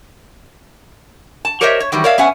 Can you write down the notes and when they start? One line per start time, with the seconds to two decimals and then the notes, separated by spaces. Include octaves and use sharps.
1.45 A5
1.61 G4 A#4 C5 C#5 D#5 E5
1.80 C#5
1.92 D#3 E3 F#3 G3
2.04 A#4 C#5 D5 E5 F5
2.18 B3 C#4 E5 F#5 G#5